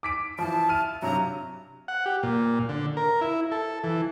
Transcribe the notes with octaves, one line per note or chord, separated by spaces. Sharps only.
D6 B6 D7
E3 F3 A5
E4 F6 D#7
G2 C3 F#3 A#5
F#5
G4
A#2
D3
A#4
E4
A4
E3